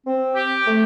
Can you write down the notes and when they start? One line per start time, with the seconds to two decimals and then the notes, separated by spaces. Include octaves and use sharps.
0.06 C4
0.36 G4
0.67 A3